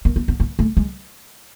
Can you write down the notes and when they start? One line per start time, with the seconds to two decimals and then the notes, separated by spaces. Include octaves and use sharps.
0.05 A#3
0.16 A#3
0.28 B3
0.40 A#3
0.59 A3
0.77 G#3